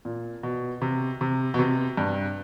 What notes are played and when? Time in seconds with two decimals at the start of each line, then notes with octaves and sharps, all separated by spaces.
0.05 A#2
0.43 B2
0.82 C3
1.21 C3
1.54 B2
1.59 C3
1.97 G2